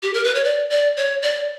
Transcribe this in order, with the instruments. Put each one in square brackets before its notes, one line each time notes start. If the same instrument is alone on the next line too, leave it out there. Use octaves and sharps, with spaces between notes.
[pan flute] G4
A#4
B4
C#5
D5
D5
C#5
D5